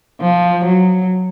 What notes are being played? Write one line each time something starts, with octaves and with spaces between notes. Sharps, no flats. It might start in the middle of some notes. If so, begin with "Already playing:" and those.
F3
F#3